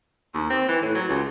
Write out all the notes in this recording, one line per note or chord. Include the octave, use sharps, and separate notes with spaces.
D#2
C4
E3
A2
F#3
C#2